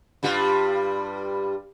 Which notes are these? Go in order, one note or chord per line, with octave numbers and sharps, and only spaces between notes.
G2 G3 F4